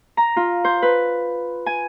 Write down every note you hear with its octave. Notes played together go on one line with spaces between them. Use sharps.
A#5
F4
C5
B4
G#5